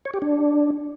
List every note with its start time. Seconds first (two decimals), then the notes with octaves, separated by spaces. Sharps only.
0.05 C#5
0.14 G4
0.22 D4